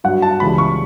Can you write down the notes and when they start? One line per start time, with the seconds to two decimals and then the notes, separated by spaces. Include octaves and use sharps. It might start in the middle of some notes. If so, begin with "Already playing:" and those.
0.04 G2 F#3 F#5
0.22 A5
0.40 C#2 C#3 E3 G3 B5
0.58 C#6